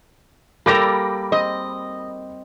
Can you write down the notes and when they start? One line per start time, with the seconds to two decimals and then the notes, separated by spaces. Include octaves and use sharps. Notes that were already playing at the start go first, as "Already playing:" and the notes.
0.66 G3 A#3 A4 A#4 G5 B5 D6 A#6
1.32 C4 D#5